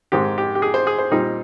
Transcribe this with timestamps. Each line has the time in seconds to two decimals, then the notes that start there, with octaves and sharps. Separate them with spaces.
0.12 G#2 D#3 G#3 C4 D#4 G4
0.38 G4
0.55 G4
0.62 G#4
0.74 C5
0.87 G#4
0.99 C5
1.11 A#2 G3 C4 D#4 C5